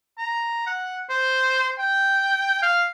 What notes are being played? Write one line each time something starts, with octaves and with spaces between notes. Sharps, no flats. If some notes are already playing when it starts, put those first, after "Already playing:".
A#5
F#5
C5
G5
F5